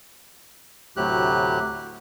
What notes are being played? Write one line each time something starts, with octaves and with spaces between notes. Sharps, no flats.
D2 A2 C3 F#3 G4 F#6